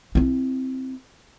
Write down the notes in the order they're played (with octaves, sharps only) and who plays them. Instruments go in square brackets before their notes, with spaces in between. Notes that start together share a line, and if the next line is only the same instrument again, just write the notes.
[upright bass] C4 E4